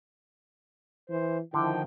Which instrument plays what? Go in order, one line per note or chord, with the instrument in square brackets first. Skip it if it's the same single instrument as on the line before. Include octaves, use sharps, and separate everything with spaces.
[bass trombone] E3 [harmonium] C5
[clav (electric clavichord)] D3 [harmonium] D#3 F3 G5 [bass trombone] E4